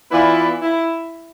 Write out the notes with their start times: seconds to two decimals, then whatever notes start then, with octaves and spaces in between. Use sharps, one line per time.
0.11 E3 B3 E4 F4 B4 D5
0.62 E4